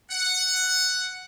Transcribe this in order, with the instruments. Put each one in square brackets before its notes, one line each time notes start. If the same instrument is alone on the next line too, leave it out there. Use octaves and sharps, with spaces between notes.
[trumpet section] F#5